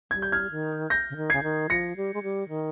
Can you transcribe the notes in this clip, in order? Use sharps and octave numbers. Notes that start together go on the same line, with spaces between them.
G3 G#6
G6
F6 G#6
D#3
G6 A#6
C#3
D#3
C#3 G#6 C7
D#3
F3 A#6 C#7
G3
G#3
G3
D#3